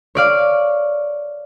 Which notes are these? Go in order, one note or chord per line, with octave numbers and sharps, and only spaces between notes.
C#5 D5 F5